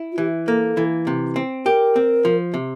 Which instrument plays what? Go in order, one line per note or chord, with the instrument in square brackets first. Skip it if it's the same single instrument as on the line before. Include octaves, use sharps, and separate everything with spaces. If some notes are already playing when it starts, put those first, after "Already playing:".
Already playing: [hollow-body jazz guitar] E4
[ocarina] F4
[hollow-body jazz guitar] E3 [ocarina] G4
[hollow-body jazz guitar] A#3 [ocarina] A4
[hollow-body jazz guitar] E3
C3
C4
[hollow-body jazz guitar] G4 [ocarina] A#4
[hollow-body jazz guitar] C4
F3
C3